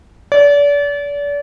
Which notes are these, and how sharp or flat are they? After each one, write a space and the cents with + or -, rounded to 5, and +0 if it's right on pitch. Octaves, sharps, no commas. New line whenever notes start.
D5 -35